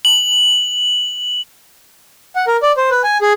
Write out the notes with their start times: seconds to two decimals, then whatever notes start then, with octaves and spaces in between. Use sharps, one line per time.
0.05 F#7
2.36 F#5
2.47 A#4
2.63 D5
2.77 C5
2.90 B4
3.04 G#5
3.21 G#4